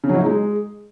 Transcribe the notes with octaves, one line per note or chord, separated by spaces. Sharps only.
C#3
F#3
E4
D#4
G#3